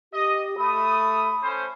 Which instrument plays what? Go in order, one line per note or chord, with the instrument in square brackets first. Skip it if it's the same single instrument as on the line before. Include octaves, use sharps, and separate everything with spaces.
[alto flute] G4 [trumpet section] D#5
[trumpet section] A3 D#6 [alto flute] B5
[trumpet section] A3 C#4 C5